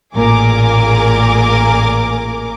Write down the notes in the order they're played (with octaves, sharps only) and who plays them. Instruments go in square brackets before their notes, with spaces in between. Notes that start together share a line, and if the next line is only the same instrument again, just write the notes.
[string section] A1 A#2 G#4 A#4 D6